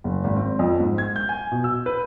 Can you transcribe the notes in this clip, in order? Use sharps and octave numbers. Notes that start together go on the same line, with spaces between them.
F#1
G#1
C4
F2
G#2
G#6
G6
G#5
B2
E6
B4